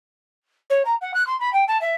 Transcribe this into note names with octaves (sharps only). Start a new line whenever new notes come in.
C#5
A#5
F#5
F#6
C6
B5
G5
A5
E5